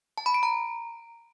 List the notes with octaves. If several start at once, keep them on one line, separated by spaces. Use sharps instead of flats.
A5
B5
D7
A#5